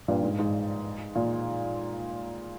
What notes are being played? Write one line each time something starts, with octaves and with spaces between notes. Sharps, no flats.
G2 A#2
G#2
G#2
A#2